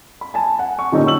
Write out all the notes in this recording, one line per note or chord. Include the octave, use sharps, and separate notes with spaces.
B5
G#5 A5
F#5
C#6
A#2 D3 C#4 D#4 G4 A4
C#5 C#6 E6 F#7